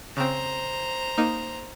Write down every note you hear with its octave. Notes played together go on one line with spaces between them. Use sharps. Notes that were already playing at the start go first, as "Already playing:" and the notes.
C#3 C4 C5 A#5
A#3 D#4